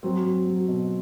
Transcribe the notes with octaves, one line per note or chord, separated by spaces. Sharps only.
F#3 C4
F#3
F#3
B2